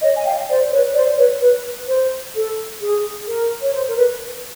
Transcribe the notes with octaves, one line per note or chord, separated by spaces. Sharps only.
C#5 D#5
G#5
F5 G5
C5 D5
D5
B4 C#5
C5 D5
B4 C#5
B4
B4
C5
A4
G#4
A#4
C#5
C5
A#4
B4